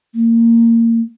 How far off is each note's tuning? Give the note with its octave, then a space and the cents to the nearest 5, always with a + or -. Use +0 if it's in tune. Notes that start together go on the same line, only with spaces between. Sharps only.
A#3 -20